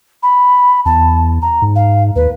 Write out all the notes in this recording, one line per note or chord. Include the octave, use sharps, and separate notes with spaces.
B5
E2 A5
A#5
G#2
F5
D#2 B4